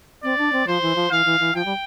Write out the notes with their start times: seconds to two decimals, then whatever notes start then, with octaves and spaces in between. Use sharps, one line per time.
0.24 C4 D5
0.38 D4
0.53 C4
0.67 F3 C5
0.82 E3
0.96 F3
1.11 E3 F5
1.26 E3
1.40 E3
1.55 F3 G5
1.65 G3